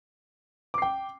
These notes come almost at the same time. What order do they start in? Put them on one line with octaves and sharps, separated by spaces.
D6 C7 G5